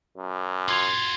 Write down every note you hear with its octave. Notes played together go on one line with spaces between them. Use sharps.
F#2
F4 F#4 C6 G#6 F7